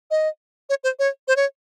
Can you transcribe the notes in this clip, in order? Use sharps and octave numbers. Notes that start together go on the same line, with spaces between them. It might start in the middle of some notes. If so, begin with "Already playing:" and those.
D#5
C#5
C5
C#5
C5
C#5